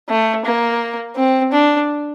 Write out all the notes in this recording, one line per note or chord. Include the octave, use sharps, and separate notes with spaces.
A3
A#3
C4
D4